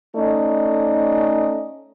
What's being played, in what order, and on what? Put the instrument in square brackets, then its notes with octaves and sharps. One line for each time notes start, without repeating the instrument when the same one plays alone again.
[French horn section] A3 C#4 D#4 D5 D#5